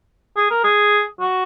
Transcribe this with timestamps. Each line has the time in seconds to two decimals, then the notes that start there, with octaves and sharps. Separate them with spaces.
0.36 G#4
0.50 A#4
0.64 G#4
1.20 F#4